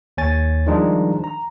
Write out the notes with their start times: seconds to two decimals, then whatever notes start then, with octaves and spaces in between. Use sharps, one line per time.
0.17 D#2 C#5 G#5 A6
0.66 D#3 F3 G3 G#3 D4 D#4
1.24 A#5